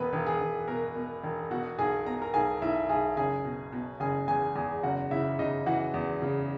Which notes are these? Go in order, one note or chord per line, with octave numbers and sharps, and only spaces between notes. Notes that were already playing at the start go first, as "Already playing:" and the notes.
Already playing: E1 B3 B4
E1
G#4
E1
B2 A#4
B2
E1
B2 F#4 F#5
B1 G#4 G#5
B2 A#5
A#4 A#5
B1 G#4 G#5
B1 E4 E5
B1 G#4 G#5
F#1 G#4 G#5
B2
B2
F#1 G#4 G#5
E2 G#4 G#5
E2 G#4 G#5
F#1 F#4 F#5
C#3 E4 E5
C#3 D#4 D#5
E3 F#4 F#5
E2
C#3